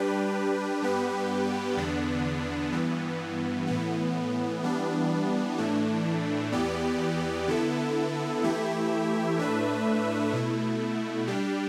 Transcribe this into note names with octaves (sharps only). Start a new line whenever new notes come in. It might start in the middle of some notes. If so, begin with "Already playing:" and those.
Already playing: G3 D4 G4 B4
G2 G3 B3 G4 B4
E2 D3 B3 D4
G2 E3 B3
A2 E3 B3
E3 G3 B3 D4
A2 E3 A3 D4
E2 E3 B3 G4 D5
D3 B3 E4 A4
E3 A3 E4 G4 E5
A2 A3 D4 B4 E5
B2 A3 E4
G3 D4 G4